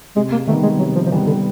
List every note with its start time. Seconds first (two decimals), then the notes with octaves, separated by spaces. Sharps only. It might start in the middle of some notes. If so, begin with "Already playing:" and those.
0.16 C3 G#3
0.32 A#3
0.48 D#3 G3 A3 B3 D#4
0.63 G#3
0.79 C3 F#3
0.95 F3
1.06 F3
1.11 D#3 E3 G3 B3 D#4
1.27 D3